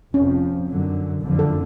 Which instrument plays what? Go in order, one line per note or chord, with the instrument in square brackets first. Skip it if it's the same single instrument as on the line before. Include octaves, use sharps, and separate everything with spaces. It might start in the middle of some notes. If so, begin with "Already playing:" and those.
[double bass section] F1 F2 F3 [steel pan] C#4
[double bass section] F#2 D3 F#3
F#1 F2 D3 F3
[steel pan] A4